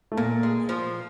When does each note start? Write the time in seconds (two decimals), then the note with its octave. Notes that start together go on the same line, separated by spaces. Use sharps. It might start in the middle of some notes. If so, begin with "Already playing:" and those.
0.12 A3
0.17 A#2 A#3
0.43 G#3
0.69 F3